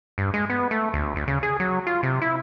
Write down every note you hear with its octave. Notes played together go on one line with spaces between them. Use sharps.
G2
G#3
B3
A3
D2
D2
C#3
G#4
F#3
F4
C3
E4